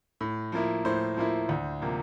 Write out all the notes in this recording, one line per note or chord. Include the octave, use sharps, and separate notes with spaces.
A2
F3 A#3 E4
A2 C5
F3 A#3 E4
D2
C3 F3 A#3